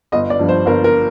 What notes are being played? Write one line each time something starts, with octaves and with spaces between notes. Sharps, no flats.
G1 D#5
D5
G2 F3
C5
G1 A#4
A#4